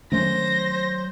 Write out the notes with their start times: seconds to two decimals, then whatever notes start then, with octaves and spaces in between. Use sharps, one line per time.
0.12 D#3 F#3 A3 C#4 C5 A#6